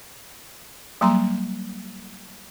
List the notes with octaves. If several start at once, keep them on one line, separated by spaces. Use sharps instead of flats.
F#3 G3 A#3 A#5 C6